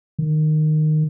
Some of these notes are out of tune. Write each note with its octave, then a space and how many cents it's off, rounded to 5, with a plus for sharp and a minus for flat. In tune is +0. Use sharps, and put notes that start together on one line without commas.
D#3 -15